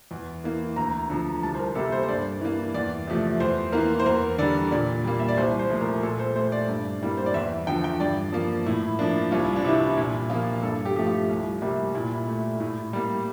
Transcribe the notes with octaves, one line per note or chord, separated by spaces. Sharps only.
E2
E3 A#3
D2 A#5
D3 F3
C2 A5
C5
A#4
C3 G3 A#3 A4
C5
C5
G2 D5
E3 A#3
E2 D5
C3 F3 A3
E2 C5
E3 A#3 A#4
C5
E2 A#4
D3 G3 D5
A#2 D5
G3 A#3
E5
D5
C2 C5
C5
A#2 F3 A3
A#4
A#2 A4
C5
A3 C5
D5
G2
E3 G3 A#3
C5
D5
E2 E5
D3 F3 G5
G5
G2 D5
F3 A#3
A2 E4
F3 A#3 D4
C2 F4
E4
D4
C3 E3 E4
A#2 E4
F3 A#3 F4
G2 A4
G4
F3 A3 G4
F4
C2
C3 G3 A#3
A#2 E4
A3
A2
G3 A#3